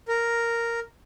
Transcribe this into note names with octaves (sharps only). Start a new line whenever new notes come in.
A#4